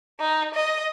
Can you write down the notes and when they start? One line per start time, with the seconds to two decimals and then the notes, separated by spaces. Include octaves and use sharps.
0.20 D#4
0.54 D#5